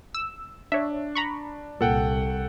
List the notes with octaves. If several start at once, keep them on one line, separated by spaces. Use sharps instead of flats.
E6
D4 C#5 E5
A#5 B5 C#6
C2 A#2 A4 F#5 G5